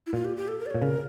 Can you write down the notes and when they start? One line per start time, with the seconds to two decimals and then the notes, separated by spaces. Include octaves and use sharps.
0.07 E4
0.13 A#2 F4
0.25 G4
0.37 G4
0.48 A4
0.60 A#4
0.66 D5
0.70 A#2 C#5
0.82 C#3 A#4